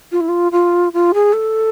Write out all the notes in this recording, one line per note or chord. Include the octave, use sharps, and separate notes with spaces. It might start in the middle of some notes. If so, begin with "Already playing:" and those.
F4
E4
F4
F4
F4
G#4
A4